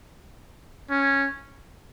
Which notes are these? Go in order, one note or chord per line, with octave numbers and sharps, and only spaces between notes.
C#4